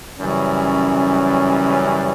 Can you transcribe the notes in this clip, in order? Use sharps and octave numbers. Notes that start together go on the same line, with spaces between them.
F#2 C#3 E3 G3 C#4